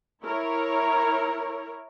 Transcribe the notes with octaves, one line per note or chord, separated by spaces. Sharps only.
E4 A#4 C#5